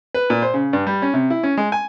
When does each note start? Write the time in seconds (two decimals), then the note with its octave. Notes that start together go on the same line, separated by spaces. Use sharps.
0.14 B4
0.30 A#2
0.42 C5
0.54 C#3
0.73 G2
0.87 G3
1.02 C#4
1.14 C3
1.30 E4
1.43 C#4
1.57 G#3
1.72 G#5